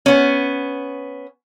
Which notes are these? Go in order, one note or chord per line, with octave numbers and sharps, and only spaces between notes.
B3 C#4